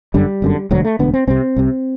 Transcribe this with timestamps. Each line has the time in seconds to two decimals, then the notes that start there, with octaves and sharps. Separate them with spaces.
0.14 G1 F#2 D3 G3
0.42 G1 F#2 D3
0.71 E1 D2 D3 F#3
0.85 A3
0.99 E1 D2 D3 B3
1.14 C4
1.27 C2 C3 C4
1.56 C2 C3